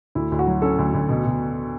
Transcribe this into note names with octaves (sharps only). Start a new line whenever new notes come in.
D2 E4
D2
F#4
F#3
C#4 A4
D2
D2
B2
B2